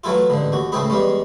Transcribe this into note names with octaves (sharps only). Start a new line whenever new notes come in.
E3 F#3 A3 E4 F4
A1 G#2 D3
D#2 F#4
C#2 A2 A3 C4 G#4 B5
E2 G3 G#3 C#4